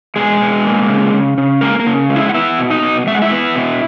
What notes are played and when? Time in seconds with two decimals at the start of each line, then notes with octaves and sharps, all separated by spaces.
0.16 B2 G#3 G#4
0.41 B2
0.65 A#3
0.89 C#3
1.13 C#3
1.38 C#3
1.61 G#3 A#3 A#4
1.79 A#3 A#4
1.87 C#3
2.10 G#3
2.16 E4 E5
2.29 F#5
2.34 B3 E4 E5
2.59 B2
2.70 D#4 D#5
2.83 B2
3.07 G#3 E5
3.14 F#5
3.22 E4 E5
3.31 B3
3.55 B2